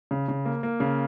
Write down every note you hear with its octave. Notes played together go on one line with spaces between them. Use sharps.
C#3
C#3
A#3
A#3
C#3